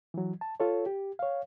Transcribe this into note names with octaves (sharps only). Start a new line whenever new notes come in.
E3 F#3
A5
F4 A4 C#5
G4
C#5 F5